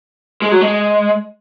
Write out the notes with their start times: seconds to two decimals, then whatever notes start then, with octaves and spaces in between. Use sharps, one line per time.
0.42 G#3
0.52 F#3
0.61 G#3